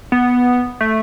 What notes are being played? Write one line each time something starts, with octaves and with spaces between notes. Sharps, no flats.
B3
A3